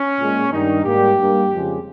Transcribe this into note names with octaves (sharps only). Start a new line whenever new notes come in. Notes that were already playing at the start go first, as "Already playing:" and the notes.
Already playing: C#4
A#2 G#3
G2 D#3 G3 D#4
G#2 G3 A#3 G4
G2 G3 A#3
F2 C#3 F3 G#3